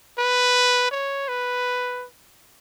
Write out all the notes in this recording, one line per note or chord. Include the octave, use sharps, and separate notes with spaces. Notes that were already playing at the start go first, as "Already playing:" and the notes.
B4
C#5
B4